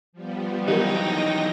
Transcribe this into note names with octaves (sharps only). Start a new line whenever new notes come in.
F3 G3 B3
D#3 E3 F#3 D#4 G4 A#4 G5 A#6